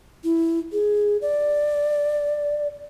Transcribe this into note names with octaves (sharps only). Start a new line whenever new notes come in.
E4
G#4
D5